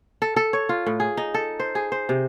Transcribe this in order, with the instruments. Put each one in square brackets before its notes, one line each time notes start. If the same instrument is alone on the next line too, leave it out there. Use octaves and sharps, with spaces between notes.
[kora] A4
A4
C#5
F4
A2
G#4
D#4
A4
C5
G#4
C5
C3